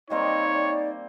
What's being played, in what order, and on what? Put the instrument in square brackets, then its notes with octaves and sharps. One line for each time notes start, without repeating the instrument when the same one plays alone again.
[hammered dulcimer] G3 A#3 C4 [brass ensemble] D#4 [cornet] C#5 [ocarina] D#5
[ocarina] D5